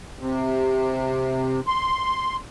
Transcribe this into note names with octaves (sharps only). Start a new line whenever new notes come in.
C3
C6